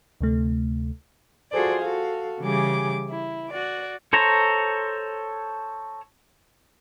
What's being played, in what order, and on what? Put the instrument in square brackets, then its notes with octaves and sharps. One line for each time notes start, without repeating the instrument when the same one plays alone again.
[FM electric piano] D2 C3 A3
[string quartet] F4 F#4 G#4 A4 C5 D5
F#4 A4 F5
C#3 E3 G3 G4 G#4 D6
E4
F#4 D5
[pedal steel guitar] A4 C5 C#5 A#5